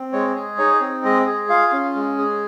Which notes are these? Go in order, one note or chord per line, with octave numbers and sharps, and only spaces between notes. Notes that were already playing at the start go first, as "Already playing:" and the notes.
Already playing: C4
G#3 C#5
G#4
D#4 C#5
C4
G#3 D#5
G#4
F4 F5
C#4
G#3
G#4